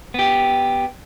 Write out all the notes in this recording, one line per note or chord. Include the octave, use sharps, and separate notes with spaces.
B3 G4